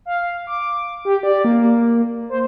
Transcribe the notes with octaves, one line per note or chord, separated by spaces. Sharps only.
F5
D6
G4
D5
A#3
C5